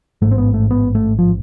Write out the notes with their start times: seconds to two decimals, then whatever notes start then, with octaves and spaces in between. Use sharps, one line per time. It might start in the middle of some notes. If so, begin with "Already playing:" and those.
0.22 A1 G#2 A3
0.31 C4
0.38 B3
0.54 A3
0.71 B3
0.95 A3
1.19 F3